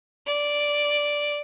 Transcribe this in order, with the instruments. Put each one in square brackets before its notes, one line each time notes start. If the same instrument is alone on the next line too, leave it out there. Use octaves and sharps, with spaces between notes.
[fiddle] D5